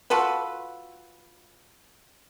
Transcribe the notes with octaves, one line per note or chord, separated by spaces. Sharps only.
F4 F#4 A4 B4